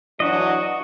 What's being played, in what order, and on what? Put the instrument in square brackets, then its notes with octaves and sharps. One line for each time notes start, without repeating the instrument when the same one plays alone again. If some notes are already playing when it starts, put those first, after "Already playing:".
[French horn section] E3 F#3 D4 [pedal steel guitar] F#4 D#5